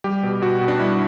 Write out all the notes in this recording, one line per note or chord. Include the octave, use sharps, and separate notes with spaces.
G3 G4
B2
B2 F#4
B2
D4
G3 E4